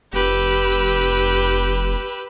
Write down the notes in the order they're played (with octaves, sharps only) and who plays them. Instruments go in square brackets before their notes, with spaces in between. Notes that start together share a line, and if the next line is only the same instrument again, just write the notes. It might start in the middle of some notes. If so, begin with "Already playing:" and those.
[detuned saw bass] F1 [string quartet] G4 B4 E6